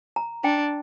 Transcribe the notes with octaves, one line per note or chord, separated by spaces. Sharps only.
A#5
D4 G5